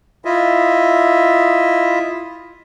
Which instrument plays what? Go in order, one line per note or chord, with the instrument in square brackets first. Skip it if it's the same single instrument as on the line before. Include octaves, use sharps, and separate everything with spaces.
[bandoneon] E4 F4 D#5 E5